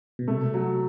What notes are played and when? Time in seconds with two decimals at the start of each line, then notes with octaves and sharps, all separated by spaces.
0.19 B2
0.28 C3 A3
0.54 F#3